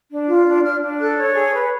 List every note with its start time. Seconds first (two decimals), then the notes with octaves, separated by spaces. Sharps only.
0.11 D4
0.30 F4
0.47 D4
0.64 D4 F6
0.82 D4
1.00 A4 F#6
1.17 C#5
1.35 G#4
1.53 B4